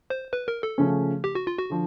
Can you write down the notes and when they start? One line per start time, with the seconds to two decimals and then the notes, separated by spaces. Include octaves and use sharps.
0.10 C5
0.33 B4
0.48 A#4
0.63 A4
0.78 C#3 F3 A3 C#4
1.24 G4
1.35 F#4
1.47 F4
1.58 F#4
1.70 D3 F3